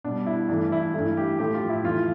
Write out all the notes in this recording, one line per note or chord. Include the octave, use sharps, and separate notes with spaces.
B2 G3 D4
E4
G2 E3 A3 D4
E4
G2 E3 A3 E4
G4
A2 F3 A3 G4
F4
E4
F2 E3 A3 F4